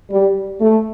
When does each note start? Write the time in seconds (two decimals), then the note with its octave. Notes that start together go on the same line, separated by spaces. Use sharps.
0.10 G3
0.61 A3